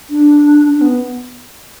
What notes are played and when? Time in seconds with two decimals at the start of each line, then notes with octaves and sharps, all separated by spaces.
0.10 D4
0.70 D4
0.81 B3